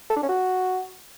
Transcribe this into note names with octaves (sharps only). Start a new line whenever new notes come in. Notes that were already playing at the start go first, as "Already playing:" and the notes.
A4
D4
C#4
F#4